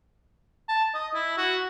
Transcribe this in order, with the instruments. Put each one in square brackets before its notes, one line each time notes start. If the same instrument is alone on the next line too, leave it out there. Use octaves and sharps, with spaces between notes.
[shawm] A5
D#5
E4
F#4